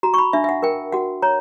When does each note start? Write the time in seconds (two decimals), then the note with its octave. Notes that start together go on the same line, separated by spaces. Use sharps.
0.03 F#4 A#5
0.14 C#6
0.18 B5
0.33 D4 E5
0.44 E5
0.49 F#5
0.63 A#4 G5
0.92 F#4 F#5
1.22 C#5 A#5